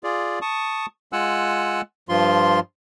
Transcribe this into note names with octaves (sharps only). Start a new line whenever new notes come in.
F4 G#4 D5
A5 C#6 D#6
G#3 F4 F#5 G#5 E6 F#6
G2 F3 F4 C6